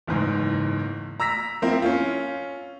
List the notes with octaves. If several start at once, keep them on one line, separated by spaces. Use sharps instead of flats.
F#1 E2 G#2
A#5 E6 A#6 B6
F3 A#3 C4 E4
C#4 F4